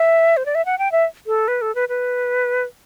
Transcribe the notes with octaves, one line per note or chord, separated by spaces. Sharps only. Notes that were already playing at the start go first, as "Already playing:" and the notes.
Already playing: E5
C5
D5
E5
F#5
G5
E5
A4
B4
A4
B4
B4